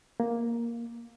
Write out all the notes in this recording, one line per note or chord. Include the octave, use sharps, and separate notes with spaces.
A#3